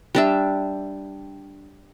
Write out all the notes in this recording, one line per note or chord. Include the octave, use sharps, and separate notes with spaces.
G3 D4 E5